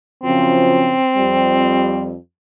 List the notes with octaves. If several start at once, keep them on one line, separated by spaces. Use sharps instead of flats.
F#2 C#3 F3 C4
F2 G3